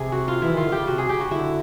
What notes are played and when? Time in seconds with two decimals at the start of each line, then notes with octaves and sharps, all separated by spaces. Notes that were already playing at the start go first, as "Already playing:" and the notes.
Already playing: C3 G#4
0.12 F#4
0.28 F4
0.42 E3 E4
0.53 D#3 F4
0.64 D3
0.72 C#3 G4
0.87 C3 F#4
0.98 G#4
1.09 C#3 G4
1.20 F#4
1.31 D3 E4